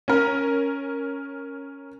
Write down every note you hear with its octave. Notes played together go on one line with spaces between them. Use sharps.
C#4 A#4